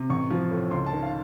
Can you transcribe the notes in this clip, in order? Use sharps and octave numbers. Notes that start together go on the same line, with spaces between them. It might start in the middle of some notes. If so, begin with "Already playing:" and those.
Already playing: C3
A1 C#6
F3
A2
C#2 C6
A5
D#3
F5